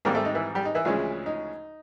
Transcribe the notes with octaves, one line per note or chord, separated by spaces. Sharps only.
G#2 D#3 G3 A#3 C4 A#4
A3 A4
D#4
E3 E4
G3 G4
D#4
E3 E4
D2 C#3 F3 G#3 C#4
D#4